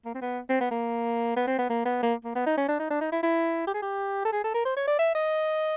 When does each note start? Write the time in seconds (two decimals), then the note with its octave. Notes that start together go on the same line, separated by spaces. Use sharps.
0.05 A#3
0.15 C4
0.22 B3
0.49 C4
0.60 B3
0.71 A#3
1.36 B3
1.47 C4
1.58 B3
1.70 A#3
1.85 B3
2.03 A#3
2.24 A#3
2.35 B3
2.46 D#4
2.57 C#4
2.68 D4
2.80 D#4
2.90 D4
3.01 D#4
3.12 E4
3.23 E4
3.67 G4
3.74 G#4
3.82 G4
4.25 A4
4.32 G#4
4.44 A4
4.54 A#4
4.65 C5
4.76 C#5
4.87 D5
4.99 E5
5.15 D#5